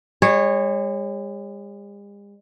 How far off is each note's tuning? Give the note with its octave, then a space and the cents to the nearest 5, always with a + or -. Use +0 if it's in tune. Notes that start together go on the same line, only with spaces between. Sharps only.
G#3 -45 C#5 -15